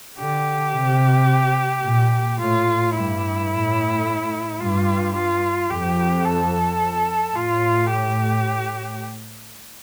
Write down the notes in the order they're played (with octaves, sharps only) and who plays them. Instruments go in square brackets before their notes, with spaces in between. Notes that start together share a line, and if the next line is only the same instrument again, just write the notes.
[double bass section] D3 [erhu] G4
[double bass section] C3
A#2
[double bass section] A2 [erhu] F4
[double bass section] G2 [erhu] E4
[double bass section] A2
[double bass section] G2 [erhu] F4
[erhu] F4
[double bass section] F2 [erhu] G4
[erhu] A4
[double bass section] A2 [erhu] F4
[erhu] G4